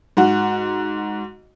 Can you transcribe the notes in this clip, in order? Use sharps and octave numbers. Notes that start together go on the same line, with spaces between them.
G#2 F#4